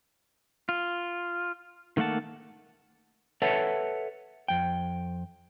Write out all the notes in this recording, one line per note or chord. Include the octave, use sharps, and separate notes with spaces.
F4
D#3 A3 A#3 F#5 A5
A4 B4 C#5 E5 F#5 A5
F2 G5